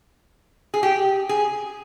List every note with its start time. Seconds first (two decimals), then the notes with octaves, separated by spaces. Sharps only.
0.74 G#4
0.83 G4
1.29 G#4